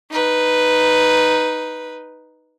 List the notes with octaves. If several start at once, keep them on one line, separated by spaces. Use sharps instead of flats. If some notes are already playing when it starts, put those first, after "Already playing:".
D#4 B4